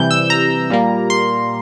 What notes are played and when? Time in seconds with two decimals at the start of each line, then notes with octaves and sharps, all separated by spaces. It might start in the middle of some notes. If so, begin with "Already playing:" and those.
Already playing: C3 E3 G3 G6
0.11 E6
0.30 A#5
0.70 A#2 G3 A#3
1.10 C6